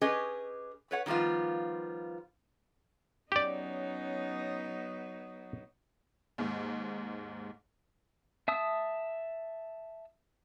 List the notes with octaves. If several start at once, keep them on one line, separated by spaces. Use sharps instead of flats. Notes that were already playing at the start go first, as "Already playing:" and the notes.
C#4 G4 G#4 B4 D#5
B4 C#5 F#5
D#3 F3 G3 B3 F4
F#3 B3 C#4 D#4 G4 D5
D#2 G#2
E5 A5 D#6 E6